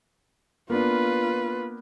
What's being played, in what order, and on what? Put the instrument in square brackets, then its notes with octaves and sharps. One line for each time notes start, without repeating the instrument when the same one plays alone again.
[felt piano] A#3 B3 D4 [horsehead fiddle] F4 B4